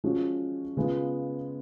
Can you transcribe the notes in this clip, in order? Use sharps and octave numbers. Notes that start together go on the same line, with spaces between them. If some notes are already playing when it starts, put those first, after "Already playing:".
F3 G#3 C#4 F#4
C#3 G#3 B3 F4